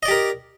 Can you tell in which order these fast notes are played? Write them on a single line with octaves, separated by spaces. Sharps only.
D#5 D5 G4 A#4